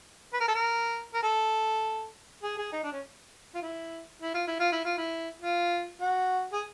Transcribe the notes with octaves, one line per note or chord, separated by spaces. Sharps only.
B4
A#4
A4
A#4
A#4
A4
G#4
G#4
D#4
D4
C#4
F4
E4
E4
F4
E4
F4
E4
F4
E4
F4
F#4
G#4